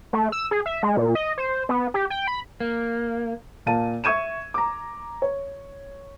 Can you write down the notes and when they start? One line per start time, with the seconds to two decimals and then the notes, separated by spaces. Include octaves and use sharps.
0.13 A3
0.32 E6
0.51 G#4
0.66 E5
0.83 G#3
0.97 A#2
1.15 D#5
1.38 C5
1.69 B3
1.94 G4
2.10 G5
2.27 B5
2.60 A#3
3.66 A#2 F5 A5 D#7
4.04 E5 C#6 G#6 D#7 E7
4.54 A#5 D6
5.22 C#5